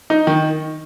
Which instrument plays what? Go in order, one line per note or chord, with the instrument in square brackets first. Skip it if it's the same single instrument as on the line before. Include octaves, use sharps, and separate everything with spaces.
[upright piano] D#4
D#3